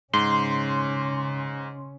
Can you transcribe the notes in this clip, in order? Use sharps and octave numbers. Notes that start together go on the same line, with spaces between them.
G#2 C#3 C#4 C6